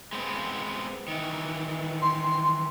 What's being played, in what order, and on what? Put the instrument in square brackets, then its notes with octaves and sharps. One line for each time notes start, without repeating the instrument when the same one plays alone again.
[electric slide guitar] G#3 B3 C4
D#3 E3
[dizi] C6